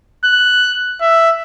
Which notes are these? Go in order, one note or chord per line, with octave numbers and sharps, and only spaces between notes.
F#6
E5